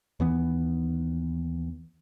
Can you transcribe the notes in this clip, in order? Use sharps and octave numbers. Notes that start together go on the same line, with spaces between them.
D#2 E3 B3